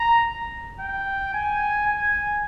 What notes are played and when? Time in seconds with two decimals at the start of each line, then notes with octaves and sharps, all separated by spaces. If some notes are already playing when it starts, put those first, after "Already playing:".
Already playing: A#5
0.80 G5
1.34 G#5
1.87 G#5